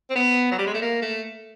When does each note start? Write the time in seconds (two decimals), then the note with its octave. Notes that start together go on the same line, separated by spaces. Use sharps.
0.10 C4
0.16 B3
0.52 F#3
0.59 G3
0.67 G#3
0.74 A3
0.82 A#3
1.02 A3